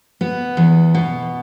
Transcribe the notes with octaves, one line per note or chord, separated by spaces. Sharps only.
B3
E2
B2